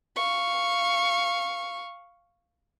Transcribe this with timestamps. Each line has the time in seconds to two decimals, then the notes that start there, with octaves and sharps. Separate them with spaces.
0.16 F5 C#6